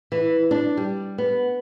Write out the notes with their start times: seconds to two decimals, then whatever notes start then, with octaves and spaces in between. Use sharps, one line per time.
0.12 E3
0.51 D4
0.77 G3
1.18 B3